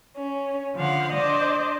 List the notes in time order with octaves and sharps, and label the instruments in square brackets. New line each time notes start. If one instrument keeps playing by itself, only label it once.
[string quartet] C#4
D3 F3 F5 F#5
D4 C5 D5 D#5